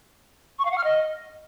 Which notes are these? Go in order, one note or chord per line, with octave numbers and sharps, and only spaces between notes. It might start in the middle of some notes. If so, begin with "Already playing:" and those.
C#6
F5
F#5
F6
D#5